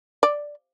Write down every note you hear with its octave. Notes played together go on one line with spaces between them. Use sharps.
D5